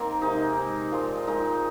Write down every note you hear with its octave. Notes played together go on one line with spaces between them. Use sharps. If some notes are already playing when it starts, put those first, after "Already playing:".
Already playing: D#3 A#3 C4
C3 G#3 D#4
C3 G#3
A#2 F3 G#3 F4
A#2 F3 G#3 D#4